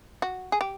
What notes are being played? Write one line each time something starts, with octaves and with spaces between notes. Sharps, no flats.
F#4
G#4
G4